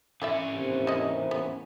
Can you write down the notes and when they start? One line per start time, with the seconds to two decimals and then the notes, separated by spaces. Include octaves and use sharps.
0.22 E3 C#4 E4 D5 E5
0.55 D#2 C3
0.87 E4 D#5
1.31 B3